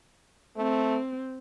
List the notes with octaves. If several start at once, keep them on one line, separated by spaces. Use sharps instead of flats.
A3 C4